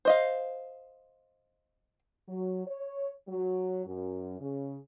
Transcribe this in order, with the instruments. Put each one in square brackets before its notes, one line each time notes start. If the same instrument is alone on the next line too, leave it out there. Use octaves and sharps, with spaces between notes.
[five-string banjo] C5 D#5 F5
[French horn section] F#3
C#5
F#3
F#2
C#3